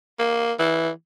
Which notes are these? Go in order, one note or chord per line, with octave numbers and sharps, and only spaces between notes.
A#3
E3